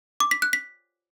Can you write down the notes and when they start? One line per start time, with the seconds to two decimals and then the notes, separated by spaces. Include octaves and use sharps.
0.20 D6
0.31 B6
0.42 F#6
0.53 B6